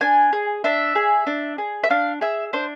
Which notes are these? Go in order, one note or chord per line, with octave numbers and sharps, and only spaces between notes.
D4 G#5
G#4
D4 E5
G#4
D4
G#4
E5
D4 F5
G#4 E5
D4 C5